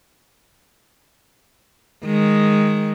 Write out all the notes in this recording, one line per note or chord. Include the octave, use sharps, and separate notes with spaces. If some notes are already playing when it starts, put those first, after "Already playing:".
D#3 G#3